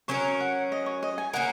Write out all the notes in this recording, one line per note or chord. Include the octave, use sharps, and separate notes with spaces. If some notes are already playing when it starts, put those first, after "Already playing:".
F#3 C#4 A#4 C#5
F#5
D#5
C#5
D#5
G#5
A#3 C#4 A#4 F#5